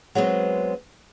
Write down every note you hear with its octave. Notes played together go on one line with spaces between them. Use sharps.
F#3 G#3 B3 C4